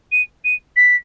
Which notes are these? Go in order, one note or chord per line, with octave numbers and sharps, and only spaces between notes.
D#7
D#7
B6